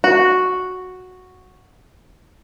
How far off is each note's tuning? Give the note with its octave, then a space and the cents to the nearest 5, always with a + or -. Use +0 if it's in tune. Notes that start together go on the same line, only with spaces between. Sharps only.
F#4 -5